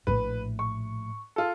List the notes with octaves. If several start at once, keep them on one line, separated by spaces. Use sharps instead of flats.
A#1 A2 B4
C#6
F4 A4